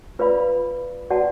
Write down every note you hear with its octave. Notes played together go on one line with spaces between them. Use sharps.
F4 B4 D5 F5 B5
F#4 B4 D5 F#5 A5